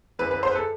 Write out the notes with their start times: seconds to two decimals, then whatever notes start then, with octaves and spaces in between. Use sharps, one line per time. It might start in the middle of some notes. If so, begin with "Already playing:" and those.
0.19 F#2 E3 B4
0.31 B4
0.43 C5
0.51 B4
0.55 A4